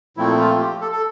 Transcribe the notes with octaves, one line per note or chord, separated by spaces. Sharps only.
A#2 F3 A3 C4 E4
F4
F4
G4
A4
A4